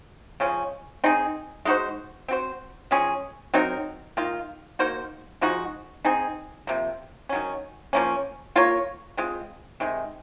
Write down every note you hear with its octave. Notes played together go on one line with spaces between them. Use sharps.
C#3 F3 G#3 C#4
C4 D#4 G#4
G#3 D#4 F#4 C5
C4 F#4 C5
F3 G#3 C#4 G#4
F#3 C4 D#4 A#4
D#3 A#3 F4
A#3 D#4 F#4 C5
F3 G#3 D#4 F#4
C4 D#4 G#4
C3 F3 A#3
D#3 F#3 C#4
F3 A#3 C#4
A#3 F4 A#4 C#5
G#3 C4 F4
C3 D#3 G#3